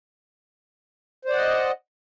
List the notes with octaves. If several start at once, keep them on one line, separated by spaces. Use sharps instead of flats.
C5 D5 D#5 F#5